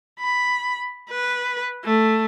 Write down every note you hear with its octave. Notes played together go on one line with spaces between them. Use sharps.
B5
B4
A3